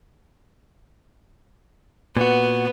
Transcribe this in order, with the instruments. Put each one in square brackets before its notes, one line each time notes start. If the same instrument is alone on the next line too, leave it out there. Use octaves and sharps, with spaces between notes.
[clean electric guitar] A#2 F#4 [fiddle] B3